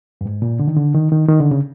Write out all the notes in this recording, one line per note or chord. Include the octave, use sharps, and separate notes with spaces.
G2
G#2
A#2
D3
D#3
D3
D#3
D#3
D#3
D3
C#3